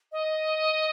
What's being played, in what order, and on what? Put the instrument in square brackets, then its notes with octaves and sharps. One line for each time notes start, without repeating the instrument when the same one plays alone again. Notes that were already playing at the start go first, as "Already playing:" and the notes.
[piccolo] D#5